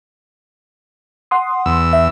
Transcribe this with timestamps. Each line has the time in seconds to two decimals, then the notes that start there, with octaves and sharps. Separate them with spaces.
1.31 F#5 C6 D#6
1.66 E2 E6
1.93 E5